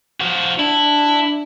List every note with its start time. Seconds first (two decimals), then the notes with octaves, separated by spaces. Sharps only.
0.20 F3 F#4
0.59 D4 E4